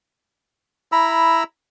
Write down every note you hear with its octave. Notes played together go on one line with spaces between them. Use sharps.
E4 A#5 B5 E6